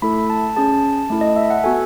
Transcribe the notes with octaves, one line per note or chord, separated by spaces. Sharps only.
A3 E4 A4 B5
A5
C#4 G#4 A5
A3 E4 A4
D#5
E5
F#5
B3 F#4 A4 G#5